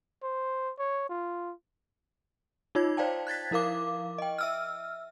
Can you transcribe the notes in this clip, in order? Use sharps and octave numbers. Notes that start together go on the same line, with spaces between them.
C5
C#5
F4
D#4 F4 C#5 G#6
C5 D5 F5 G5 A5
F#6 G#6 A6 B6
F3 E4 A#4 F5 D6
D#5 G5
E5 E6 F6